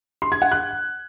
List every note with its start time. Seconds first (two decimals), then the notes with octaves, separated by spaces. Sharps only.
0.22 C6
0.32 G#6
0.42 F#5
0.52 F#6